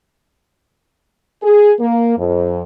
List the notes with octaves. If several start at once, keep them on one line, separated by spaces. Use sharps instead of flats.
G#4
A#3
F2